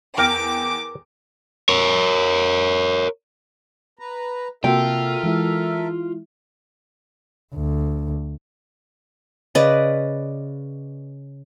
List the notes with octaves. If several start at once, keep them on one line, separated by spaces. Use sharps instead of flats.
E2 A#4 G5 D6
A#4 C#5
B4 A#5
C3 A#3 F4 F#4 A4 A#4 E5 G5
E3 G#3 E4
D2
C#3 B4 D5 D#5